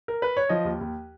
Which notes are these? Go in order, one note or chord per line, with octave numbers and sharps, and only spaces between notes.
A#4
B4
C#5
F3 D#5
D#2
D#2